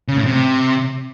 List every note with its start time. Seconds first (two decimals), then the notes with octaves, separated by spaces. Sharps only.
0.08 C#3
0.17 A2
0.26 C3